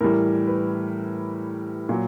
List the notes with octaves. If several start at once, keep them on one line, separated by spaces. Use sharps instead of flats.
A2 E3 G3 A#4
B4
A#2 F#3